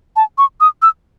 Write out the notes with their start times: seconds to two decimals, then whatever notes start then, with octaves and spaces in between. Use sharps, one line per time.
0.16 A5
0.38 C#6
0.61 D#6
0.82 E6